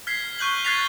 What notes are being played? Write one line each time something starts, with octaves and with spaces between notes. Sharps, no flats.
F6 G#6 B6 C7
C#6 F#6 G6 F#7 G7
F#6 G#6 A6 B6 C7 F7